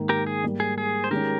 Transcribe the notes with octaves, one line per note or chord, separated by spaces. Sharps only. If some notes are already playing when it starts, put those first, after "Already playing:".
Already playing: G#2 D#3 A#3 D#4
G4 A#4
G#4
G#2 G3 A#3
G#4
G#4
C5
D#3 G#3 C#4 G4 A#4